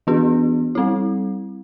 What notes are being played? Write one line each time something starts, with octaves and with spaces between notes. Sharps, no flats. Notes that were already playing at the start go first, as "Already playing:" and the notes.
E3 B3 D4 F#4
G3 C4 E4